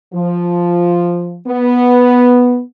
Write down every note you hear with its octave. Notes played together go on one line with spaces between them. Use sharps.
F3
B3